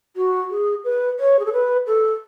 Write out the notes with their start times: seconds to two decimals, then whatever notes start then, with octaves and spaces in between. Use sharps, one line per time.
0.16 F#4
0.51 G#4
0.84 B4
1.19 C#5
1.39 G#4
1.45 A4
1.53 B4
1.87 A4